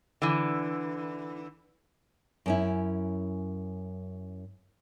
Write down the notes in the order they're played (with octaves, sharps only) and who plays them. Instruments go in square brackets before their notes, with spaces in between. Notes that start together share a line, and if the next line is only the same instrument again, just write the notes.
[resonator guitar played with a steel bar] D3 E3
[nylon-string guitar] F#2 C#4 E4